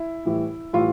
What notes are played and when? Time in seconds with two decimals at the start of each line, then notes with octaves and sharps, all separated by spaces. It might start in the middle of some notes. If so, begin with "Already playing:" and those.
Already playing: E4
0.25 A2 E3 G3
0.73 A2 E3 G3 F4